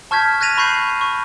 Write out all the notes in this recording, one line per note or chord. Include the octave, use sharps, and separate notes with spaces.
A5 C#6 F6 G6 G#6 B6
F#6 G#6 A#6 D#7 F7
B5 C#6 F#6 G6 C7
C#6